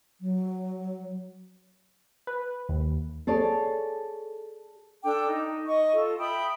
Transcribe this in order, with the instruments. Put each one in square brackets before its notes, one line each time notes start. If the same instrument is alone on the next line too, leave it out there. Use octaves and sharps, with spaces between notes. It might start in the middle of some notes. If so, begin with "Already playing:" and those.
[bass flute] F#3
[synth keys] B4
D#2
[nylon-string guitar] G#4 A4 C#5 D5
[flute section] D4 A4 G5 D6
D#4
D#5 C#6
F4 A4
E5 G5 B5 D#6